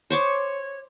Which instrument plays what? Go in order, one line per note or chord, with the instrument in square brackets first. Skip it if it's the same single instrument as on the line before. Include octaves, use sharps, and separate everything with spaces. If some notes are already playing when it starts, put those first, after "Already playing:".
[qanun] C5 C#6 D6 [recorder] C#5